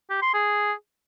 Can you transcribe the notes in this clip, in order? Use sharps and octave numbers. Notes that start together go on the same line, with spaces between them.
G4
C6
G#4